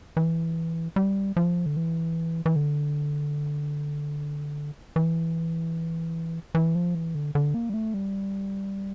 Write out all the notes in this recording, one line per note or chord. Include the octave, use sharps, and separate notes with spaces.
E3
G3
F3
D3
E3
E3
D3
E3
E3
F3
E3
D3
D3
A#3
G3
A3
G3